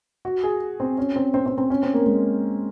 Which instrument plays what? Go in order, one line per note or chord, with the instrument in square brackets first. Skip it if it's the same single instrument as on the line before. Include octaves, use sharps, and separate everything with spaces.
[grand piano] F#4
G#4
C4
C#4
C4
C4
C4
C4
C#4
C4
A#3
G#3